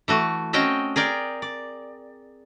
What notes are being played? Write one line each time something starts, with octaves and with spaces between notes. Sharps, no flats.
E3 A3 F#4
C4 C#4 F#4 D#5 G5
G#4 A#4 D5 G5
D5